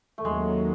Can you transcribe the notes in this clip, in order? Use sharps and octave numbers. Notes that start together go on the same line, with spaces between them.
A3
D#2 D#3 F#3 G#3 A#3 C#4